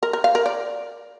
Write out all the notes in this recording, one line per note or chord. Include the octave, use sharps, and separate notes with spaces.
A#4
A#4
F5
A#4
D5